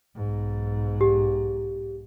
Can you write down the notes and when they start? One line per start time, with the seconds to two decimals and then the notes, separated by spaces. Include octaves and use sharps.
0.15 B1 G#2
1.01 G4